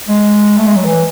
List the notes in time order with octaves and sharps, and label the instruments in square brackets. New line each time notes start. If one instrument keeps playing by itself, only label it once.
[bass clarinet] G#3
A3
G#3
F#3
E3